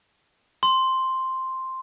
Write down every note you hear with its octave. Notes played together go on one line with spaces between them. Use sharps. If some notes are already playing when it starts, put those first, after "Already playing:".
C6